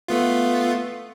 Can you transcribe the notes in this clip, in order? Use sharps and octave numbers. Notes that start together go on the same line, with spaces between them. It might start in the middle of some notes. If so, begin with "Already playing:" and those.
A3 B3 F4